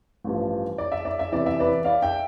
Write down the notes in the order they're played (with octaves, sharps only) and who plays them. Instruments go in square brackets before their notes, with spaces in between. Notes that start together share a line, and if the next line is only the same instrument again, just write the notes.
[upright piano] A1 G2 F3
D5
E5
D5
E5
E2 C3 E3 D5
E5
B4 D5
D5 F5
E5 G5